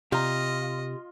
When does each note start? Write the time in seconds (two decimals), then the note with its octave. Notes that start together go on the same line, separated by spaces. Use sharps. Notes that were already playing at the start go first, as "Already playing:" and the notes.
0.12 C3 F4 G4 D#5 A#5